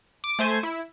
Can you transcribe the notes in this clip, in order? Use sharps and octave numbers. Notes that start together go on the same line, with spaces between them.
D6
A3 C5 G#5
E4